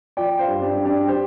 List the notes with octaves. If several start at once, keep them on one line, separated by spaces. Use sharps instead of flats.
F3 D5 G5
C5 F5
G2
D4 G4
G2
D4 G4
G4 C5